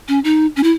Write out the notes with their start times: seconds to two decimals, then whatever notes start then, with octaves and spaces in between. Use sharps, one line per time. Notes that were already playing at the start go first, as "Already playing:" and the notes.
0.08 C#4
0.24 D#4
0.56 C#4
0.63 E4